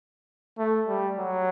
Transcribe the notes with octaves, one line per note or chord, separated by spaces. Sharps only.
A3
G3
F#3